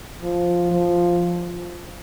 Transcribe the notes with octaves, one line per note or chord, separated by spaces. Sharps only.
F3
F3